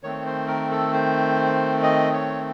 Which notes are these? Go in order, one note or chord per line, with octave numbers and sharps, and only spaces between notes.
D#3 A3 C4 C#5
C5
A#4
A4
C5
D#5
C#5